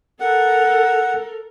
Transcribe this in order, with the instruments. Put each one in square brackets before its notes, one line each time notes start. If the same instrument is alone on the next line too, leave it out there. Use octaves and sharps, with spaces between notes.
[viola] A4 A#4 [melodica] F#5